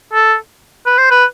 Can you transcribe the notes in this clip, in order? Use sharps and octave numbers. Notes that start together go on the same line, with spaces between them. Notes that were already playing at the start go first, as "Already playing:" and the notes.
A4
B4
C5
B4